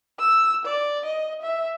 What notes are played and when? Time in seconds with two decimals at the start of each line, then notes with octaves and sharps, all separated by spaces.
0.20 E6
0.65 D5
1.06 D#5
1.42 E5